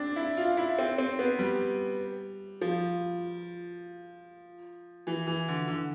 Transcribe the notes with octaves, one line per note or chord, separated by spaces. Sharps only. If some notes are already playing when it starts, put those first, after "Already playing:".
Already playing: C4 D4
E4
F4
E4
C4
C4
B3
G3
F3
E3
E3
D3
D3